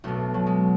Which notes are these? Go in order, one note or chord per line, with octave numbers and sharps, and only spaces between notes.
B1 B2 A3
F#3
G#3